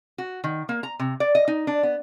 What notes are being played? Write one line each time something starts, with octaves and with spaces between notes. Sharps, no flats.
F#4
D#3
A#3
A#5
C3
D5
D#5
D#4
D4
B3